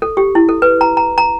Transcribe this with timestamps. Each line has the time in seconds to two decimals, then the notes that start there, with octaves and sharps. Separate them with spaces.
0.02 A4
0.17 G4
0.35 E4
0.49 A4
0.62 B4
0.81 A#5
0.97 A#5
1.18 A#5